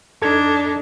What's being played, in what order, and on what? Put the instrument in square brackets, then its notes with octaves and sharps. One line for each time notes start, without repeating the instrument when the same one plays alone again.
[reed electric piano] F2 A4 G#6 [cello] D4 D#4